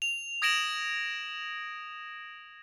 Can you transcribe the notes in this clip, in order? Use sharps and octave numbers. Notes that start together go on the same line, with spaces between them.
F7
D#6 G#6 A#6 D7 E7 F#7